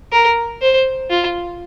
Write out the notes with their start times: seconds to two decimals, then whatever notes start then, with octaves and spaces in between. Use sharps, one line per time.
0.12 A#4
0.62 C5
1.10 F4